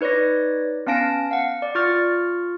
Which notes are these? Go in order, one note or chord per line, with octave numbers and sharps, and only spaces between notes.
D#4 B4 C#5 D5 A#6
B3 C#4 F5 A5 A#6 D7
F5 F#5
D5
F4 C#6 F6 A6